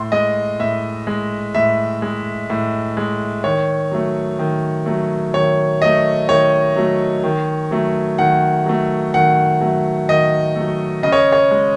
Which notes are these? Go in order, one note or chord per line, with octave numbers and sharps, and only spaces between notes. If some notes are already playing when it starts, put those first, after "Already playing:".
Already playing: A2 C6
G#3 D#5
A2 E5
G#3
A2 E5
G#3
A2
G#3
D#3 C#5
F#3 A3
D#3
F#3 A3
D#3 C#5
F#3 A3 D#5
D#3 C#5
F#3 A3
D#3
F#3 A3
D#3 F#5
F#3 A3
D#3 F#5
F#3 A3
D#3 D#5
F#3 A3
C#3 D#5
C#5
C#5
G#3